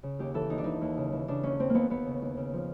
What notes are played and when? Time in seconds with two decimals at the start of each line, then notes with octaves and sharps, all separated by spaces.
0.03 C#3
0.19 D#2 G4
0.34 E3 A4
0.50 D#2 D#4
0.58 D4
0.64 E3 D#4
0.81 D#2
0.97 C#3
1.12 E3
1.28 C#3 D4
1.43 D#2 C#4
1.59 D#2 C4
1.70 D#2 A#3 B3
1.90 D#2 B3
2.06 C#3
2.22 D#2
2.37 C#3
2.53 F3